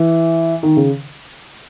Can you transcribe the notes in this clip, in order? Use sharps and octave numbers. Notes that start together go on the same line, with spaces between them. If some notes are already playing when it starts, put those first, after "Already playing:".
Already playing: E3
D#3
C#3